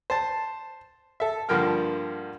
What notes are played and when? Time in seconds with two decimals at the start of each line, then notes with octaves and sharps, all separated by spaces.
0.10 C5 A5
1.20 A4 E5
1.49 G2 D3 F3 A#3 G5 F6